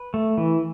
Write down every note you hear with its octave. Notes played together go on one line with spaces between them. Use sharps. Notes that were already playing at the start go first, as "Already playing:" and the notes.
Already playing: B4
A3
E3